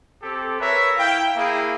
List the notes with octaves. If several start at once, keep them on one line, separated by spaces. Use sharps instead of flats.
C4 G4 A4
A#4 B4 C#5 E5
E4 F5 G5
A#3 E4 G#4